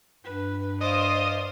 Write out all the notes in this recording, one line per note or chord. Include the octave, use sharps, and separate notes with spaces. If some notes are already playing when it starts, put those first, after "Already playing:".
G2 B4
C5 D5 D#5 F5